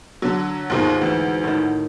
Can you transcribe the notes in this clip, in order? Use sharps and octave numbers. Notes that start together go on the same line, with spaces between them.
D3 F#3
D#2 G#2 B2 D#3 F4
D2 E3
A2 D#3